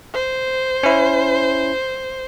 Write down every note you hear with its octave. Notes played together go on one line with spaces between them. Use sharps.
C5
C#4 E4